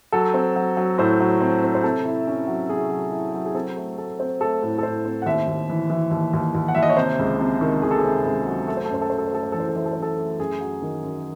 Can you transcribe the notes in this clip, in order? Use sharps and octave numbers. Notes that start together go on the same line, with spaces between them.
F#3 A4
C4
F#3
F#3
A2 C5
F#3
C4
C4
C5
C3 A4
E4
C#4
F#3
C3 G#4
F#3
E4
F#3
G#4
C4 A4
A3
A3 A4
C4 C5
A3 A4
A2
A4
A2 C5
C4
F#5
D#2 E5
D#2
E3
E3
D#2
D#2
D#2
F#5
D#2 E5
D#5
C#5
C3 C5
C#2
C3
D#3
D#3 G#4
A4
G#4
C3
C#2
F#3
A3 A4
C5
A4
F#2 C5
A4
A3 C5
A4
C5
A3 A4
C5
E3 A4
C5
A4
E3 C5
A4
C5
F#2
A4
A3
F#2 G#4
F#3
D#3
F#2